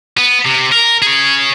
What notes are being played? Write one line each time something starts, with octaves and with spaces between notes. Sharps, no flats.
B3
C3
A#4
G#4 C#5